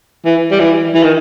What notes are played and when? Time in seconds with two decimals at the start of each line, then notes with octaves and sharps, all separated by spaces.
0.25 E3
0.51 G3
0.60 E3
0.95 E3
1.04 D#3